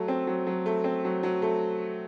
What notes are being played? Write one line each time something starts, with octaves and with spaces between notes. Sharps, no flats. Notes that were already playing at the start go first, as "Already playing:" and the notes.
Already playing: F#3 A3
C4
F#3
F#3
A3
C4
F#3
F#3
A3